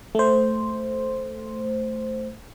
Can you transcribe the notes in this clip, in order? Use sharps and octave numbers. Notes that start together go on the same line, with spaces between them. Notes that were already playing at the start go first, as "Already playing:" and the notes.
A3 C5